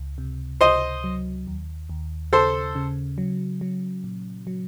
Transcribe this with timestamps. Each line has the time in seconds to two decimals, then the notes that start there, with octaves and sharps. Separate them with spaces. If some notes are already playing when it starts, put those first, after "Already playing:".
Already playing: C#2
0.18 C3
0.61 C#2 C5 D#5
1.04 F#3
1.47 D#2
1.90 D#2
2.32 C#3 A4 C5
2.75 C#3
3.18 F#3
3.61 F#3
4.04 A#2
4.47 F#3